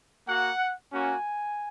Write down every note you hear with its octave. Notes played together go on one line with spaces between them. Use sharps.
A#3 F#4 F#5
A#3 C#4 F#4 G#5